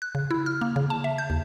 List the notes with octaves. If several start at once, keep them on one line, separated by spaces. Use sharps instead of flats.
F#6
C#3
E4
F6
A#3
C#3
A5
E5
G6
D#2